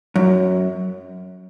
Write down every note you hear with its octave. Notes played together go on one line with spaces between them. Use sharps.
F#2